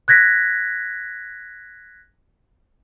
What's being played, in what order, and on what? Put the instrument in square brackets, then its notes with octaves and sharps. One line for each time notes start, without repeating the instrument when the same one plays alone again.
[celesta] F#6 G#6 A#6 B6